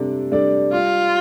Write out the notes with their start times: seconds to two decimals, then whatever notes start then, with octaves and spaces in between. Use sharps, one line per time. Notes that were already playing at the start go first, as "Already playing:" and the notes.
Already playing: C3 G3 D4 A4 D5
0.32 G3 D4 A4 D5
0.72 G3 F4